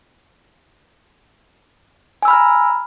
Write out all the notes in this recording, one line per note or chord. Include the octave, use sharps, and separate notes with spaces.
G#5 A#5 B5 E6 F6